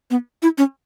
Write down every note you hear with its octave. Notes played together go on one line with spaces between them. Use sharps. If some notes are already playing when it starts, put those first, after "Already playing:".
B3
E4
C#4